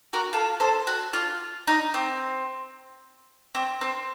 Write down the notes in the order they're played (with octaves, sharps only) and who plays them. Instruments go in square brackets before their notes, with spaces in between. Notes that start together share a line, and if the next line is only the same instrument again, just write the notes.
[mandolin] F#4 A#4
F4 A4
A4 C5
F#4
F4
D#4
C4
C4
C4